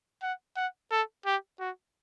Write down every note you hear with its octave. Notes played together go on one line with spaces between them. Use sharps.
F#5
F#5
A4
G4
F#4